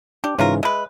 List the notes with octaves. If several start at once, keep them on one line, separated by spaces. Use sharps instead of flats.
D4 G4
G#2 C#3 E3 C#4 F4 A#4
G#3 B4 E5